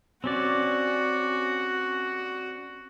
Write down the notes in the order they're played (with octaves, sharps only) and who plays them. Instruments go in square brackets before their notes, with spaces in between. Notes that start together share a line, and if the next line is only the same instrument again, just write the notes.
[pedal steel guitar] C4 C#4 D5 [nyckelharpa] F#4